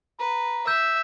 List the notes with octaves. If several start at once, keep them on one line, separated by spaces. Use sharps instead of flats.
B4 A#5
E5 E6 G6